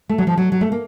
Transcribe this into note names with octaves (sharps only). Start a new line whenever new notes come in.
A3
F#3
F3
F#3
F#3
A3
A#3